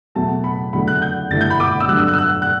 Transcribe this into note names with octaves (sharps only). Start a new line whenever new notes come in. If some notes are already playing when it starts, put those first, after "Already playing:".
E2 B2 F#3 A3 A5
B5
E2 D3 F#3 A3 B5
F#6
G6
G1 G2 E3 A3 A6
G6
B5
D6
E6
G2 D3 F#3 F#6
E6
F#6
E6
F#6
F#6